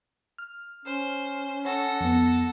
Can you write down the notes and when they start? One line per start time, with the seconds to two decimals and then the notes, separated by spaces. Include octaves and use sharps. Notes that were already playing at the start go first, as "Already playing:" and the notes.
0.38 F6
0.85 C#4 C5
1.65 A4 C#5 F#5 A#6
2.00 F2 B3